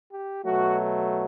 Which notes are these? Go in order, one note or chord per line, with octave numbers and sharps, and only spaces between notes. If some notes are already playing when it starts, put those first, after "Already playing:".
G4
B2 F#3 A3 F#4